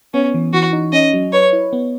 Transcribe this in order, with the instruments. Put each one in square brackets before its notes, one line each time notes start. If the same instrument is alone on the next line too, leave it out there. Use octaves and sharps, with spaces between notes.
[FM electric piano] B3 [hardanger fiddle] C#4
[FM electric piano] E3
[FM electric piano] E3 [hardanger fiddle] F#4
[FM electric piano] D#4
[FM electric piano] C#4 [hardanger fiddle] D#5
[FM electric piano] F#3
[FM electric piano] B4 [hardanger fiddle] C#5
[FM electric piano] E4
B3